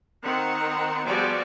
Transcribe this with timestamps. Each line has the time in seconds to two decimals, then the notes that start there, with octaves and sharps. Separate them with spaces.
0.23 D#3 C4 F#5
1.04 F3 G3 B3 F#4 G#4 D5